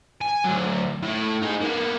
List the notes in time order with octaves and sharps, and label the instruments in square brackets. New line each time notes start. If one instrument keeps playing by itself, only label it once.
[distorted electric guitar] G#5
D2 F#3
A2 E4
D#4 G#4
A#3 B3